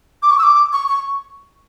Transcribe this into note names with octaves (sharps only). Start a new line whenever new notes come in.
D6
C#6
E6
D6
C#6
C#6